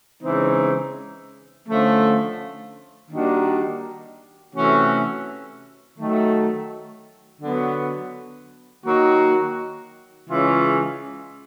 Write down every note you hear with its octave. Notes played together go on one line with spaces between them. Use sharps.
C#3 E3 G#3 C4 D#4
D3 F3 A3 C#4
D#3 G3 A#3 D4 F#4
C3 E3 A3 C#4 F#4
D#3 F#3 A3
D3 F#3 B3
D#3 F#3 A#3 D#4 F#4
C#3 E3 G#3 C#4 F4